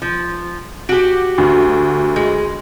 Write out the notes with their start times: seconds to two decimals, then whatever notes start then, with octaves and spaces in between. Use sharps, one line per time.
0.02 F3
0.89 F#4 G4 D7
1.38 D2
2.16 G#3